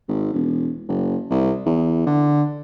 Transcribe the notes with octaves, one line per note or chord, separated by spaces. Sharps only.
G#1
E1
F#1
C2
E2
D3